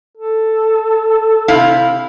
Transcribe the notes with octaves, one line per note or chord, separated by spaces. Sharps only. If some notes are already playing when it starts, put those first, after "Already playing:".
A4
C3 E4 F5